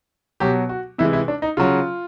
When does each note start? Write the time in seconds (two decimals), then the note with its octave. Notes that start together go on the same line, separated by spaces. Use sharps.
0.40 B2 F#3 G4
0.69 F#4
0.98 C3 E3 G#3 E4
1.13 E4
1.28 D4
1.42 D#4
1.57 C#3 F#3 F4